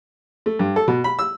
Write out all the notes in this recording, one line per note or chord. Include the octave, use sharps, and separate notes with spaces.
A3
G2
A4
B2
B5
E6